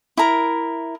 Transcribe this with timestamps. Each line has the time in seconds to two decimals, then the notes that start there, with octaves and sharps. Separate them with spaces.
0.17 E4 A#4